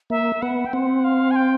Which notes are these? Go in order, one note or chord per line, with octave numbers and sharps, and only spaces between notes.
A#3 E5
B3 F#5
G5
C4 F#5
F5
G#5
G5